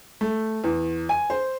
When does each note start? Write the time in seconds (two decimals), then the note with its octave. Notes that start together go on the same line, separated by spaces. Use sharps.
0.21 A3
0.64 E2
1.09 G#5
1.30 C5